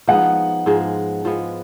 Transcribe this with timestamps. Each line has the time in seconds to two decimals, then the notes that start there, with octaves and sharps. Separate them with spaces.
0.07 F3 G#3 B3 D#4 F#5
0.66 G#2 F3 G#3
1.25 F3 G#3 B3